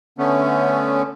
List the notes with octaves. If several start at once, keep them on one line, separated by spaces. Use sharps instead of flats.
D3 A3 B3 C#4